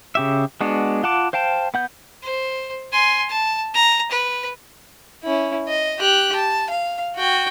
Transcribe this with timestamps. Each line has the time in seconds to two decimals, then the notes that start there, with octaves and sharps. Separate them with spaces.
0.15 C#3 G4 E5
0.61 G#3 B3 D4 F#4
1.03 F4 F#5 A5 D6
1.33 C5 F5 G5 A5
1.74 B3 F#5 G6
2.22 C5
2.92 G#5 C6
3.29 A5
3.74 A#5
4.11 B4
5.23 C#4 E4
5.68 D#5
5.99 G4 F#6
6.35 A5
6.70 F5
7.16 F#4 G5